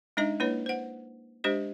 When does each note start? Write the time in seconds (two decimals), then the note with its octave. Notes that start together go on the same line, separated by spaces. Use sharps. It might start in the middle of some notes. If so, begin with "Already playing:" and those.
0.17 G#3 D4 D#4 D#5 A#5
0.40 A#3 D4 E4 B4 C#5
0.66 C5 F#5
1.44 G#3 D4 G4 C5 D#5